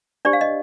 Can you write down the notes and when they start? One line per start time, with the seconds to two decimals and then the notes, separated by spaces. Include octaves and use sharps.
0.25 D4 G4 C5 D5
0.33 F5
0.41 D#5